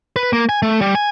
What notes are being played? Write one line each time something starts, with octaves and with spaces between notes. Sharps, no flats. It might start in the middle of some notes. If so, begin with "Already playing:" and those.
B4
A#3
G#5
A3
G3
G#5